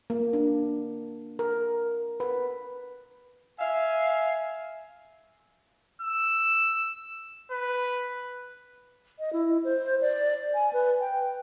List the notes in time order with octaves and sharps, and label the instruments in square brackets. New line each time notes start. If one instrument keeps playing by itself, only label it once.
[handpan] A#3
D4
A#4
B4
[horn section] E5 F5 G#5
[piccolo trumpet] E6
B4
[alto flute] D#5
E4
C5
D5
G#5
B4
G5